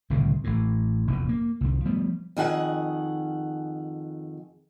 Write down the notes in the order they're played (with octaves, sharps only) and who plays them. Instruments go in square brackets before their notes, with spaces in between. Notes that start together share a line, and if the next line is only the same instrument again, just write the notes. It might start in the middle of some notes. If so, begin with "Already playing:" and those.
[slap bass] D1 C2 C#3
A1 A2
F1 A#1 E2
A#3
C2 F2
F3 G3 A3 B3
[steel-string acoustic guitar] F2 D#3 G#4 F#5